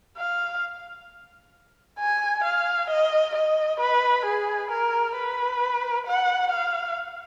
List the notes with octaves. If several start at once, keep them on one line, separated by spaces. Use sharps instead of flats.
F5
G#5
F5
D#5
D#5
B4
G#4
A#4
B4
F#5
F5